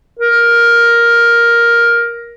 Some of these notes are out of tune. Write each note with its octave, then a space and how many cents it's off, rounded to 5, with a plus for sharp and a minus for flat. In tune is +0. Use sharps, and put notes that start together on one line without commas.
A#4 +10